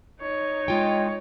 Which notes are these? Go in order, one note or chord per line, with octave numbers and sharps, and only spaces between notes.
D#4 C#5
G#3 F4 G5